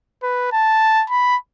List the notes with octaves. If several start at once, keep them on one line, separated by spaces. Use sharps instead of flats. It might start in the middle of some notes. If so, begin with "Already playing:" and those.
B4
A5
B5